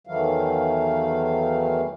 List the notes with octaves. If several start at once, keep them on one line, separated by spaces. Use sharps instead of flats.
E2 D#3 E3 F#3 A3 F5